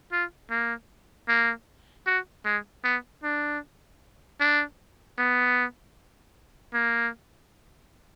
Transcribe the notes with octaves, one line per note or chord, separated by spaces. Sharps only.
F4
A#3
A#3
F#4
G#3
B3
D4
D4
B3
A#3